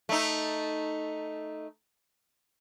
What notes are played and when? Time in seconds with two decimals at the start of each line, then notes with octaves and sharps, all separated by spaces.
0.09 A3 D#4